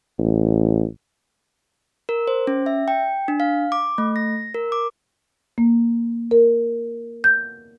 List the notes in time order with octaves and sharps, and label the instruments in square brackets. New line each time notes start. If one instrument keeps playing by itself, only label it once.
[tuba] A1
[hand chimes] A#4
C5
C#4
E5
G5
D4
F5
D6
A3
A#6
A#4
D6
[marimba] A#3
A#4
G6